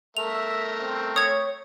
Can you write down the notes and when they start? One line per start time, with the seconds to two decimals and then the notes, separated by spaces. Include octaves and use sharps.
0.17 A3 A#4 E5 F7
0.81 C4
1.16 C#5 D#6 G#6